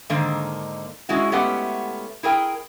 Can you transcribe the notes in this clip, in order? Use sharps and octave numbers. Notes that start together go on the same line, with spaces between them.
G#2 D3 D#3 A#3
G#3 C#4 E4 F#4
G#3 A3 B3 C#4 G4 F#5
E4 G#4 A#4 G5